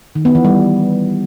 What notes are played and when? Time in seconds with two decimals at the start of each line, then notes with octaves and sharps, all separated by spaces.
0.15 D#3
0.25 B3
0.35 E3
0.45 G3